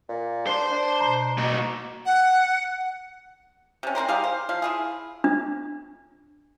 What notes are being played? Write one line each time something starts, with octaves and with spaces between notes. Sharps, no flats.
A#2
D4 C5 C6
D4
B2 A#5
A#3 D#4 F#4
F#5
C3 C#4
C4 D4 A#4 C5
G3 G4 G#4 F5
C5
F3 F5
E4 F4 G#4
D4